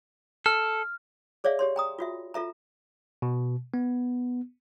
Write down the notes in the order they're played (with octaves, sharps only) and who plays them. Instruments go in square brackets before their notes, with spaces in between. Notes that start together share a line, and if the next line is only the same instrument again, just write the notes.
[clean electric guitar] A4 [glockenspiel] F6
[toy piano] G#4 C#5 D5 E5 F5
G4 C#5 C6
G5 A#5 D#6
F4 F#4 E5
F4 A4 E5 A#5
[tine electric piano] B2
B3